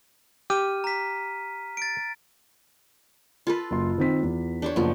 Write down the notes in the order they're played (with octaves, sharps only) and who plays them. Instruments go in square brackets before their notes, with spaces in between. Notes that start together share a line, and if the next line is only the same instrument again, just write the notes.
[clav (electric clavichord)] G4 [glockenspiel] F6 D#7
[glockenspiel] A#5 B6
A6 D7
[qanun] F4 A4 B4
[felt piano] F#1 C6
D#3 C4 B6
E2
[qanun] D4 G4 C#5
[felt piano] F#1 [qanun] F3 B3